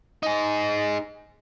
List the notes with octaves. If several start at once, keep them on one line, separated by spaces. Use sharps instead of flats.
D#4 G#4